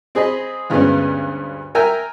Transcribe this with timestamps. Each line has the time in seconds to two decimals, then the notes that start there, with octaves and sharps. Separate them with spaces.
0.15 C4 G#4 D#5 B5
0.70 D2 G2 G#3 B3 C#4
1.75 A#4 E5 G5 G#5 A#5